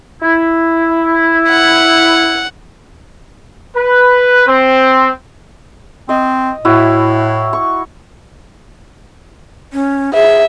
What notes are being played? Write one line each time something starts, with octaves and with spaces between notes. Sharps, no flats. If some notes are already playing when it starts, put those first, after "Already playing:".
E4
F#5
B4
C4
C4 D#5
A2 E4 F#4
C#6
C#4
G#4 E5